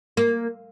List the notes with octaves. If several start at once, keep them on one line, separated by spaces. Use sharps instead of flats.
A#3